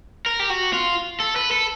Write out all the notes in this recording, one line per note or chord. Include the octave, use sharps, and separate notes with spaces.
A#4
G4
F#4
F4
A4
B4
A4